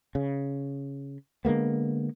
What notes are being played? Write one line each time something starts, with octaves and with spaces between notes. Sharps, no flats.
C#3
D3 G#3 A#3 B3